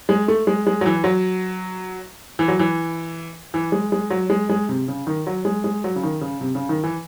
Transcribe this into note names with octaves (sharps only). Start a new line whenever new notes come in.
G#3
A3
G#3
G#3
F#3
E3
F#3
E3
F#3
E3
E3
G#3
G#3
F#3
G#3
G#3
C3
C#3
D#3
F#3
G#3
G#3
F#3
C#3
D#3
C#3
C3
C#3
D#3
E3